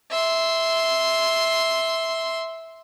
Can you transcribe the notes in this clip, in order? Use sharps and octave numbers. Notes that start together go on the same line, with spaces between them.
E5 C6